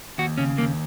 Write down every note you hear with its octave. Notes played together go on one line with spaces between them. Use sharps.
D#2 F#4
C#3 C#4
D#2 A#3